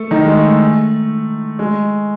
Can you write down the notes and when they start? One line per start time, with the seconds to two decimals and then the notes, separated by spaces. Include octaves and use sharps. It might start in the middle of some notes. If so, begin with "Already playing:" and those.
Already playing: A3 A4
0.11 D#3 D#4
0.25 G#3
0.35 A3
1.59 G#3